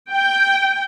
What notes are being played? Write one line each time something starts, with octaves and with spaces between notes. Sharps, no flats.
G5